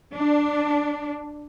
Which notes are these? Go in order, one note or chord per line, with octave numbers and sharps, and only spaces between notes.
D4